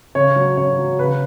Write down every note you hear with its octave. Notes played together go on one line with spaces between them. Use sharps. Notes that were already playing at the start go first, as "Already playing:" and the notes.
C#3 C#5
F#3
C#3 C#5
F#3
C#3 B4